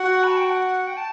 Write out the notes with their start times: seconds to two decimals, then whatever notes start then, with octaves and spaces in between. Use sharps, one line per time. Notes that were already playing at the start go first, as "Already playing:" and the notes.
Already playing: F#4 F#5
0.24 B5
0.30 A5
0.37 G5
0.45 F#5
0.87 G5
0.97 A5